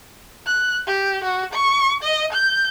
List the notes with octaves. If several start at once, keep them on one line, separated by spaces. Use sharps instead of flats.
F#6
G4
F#4
C#6
D#5
G6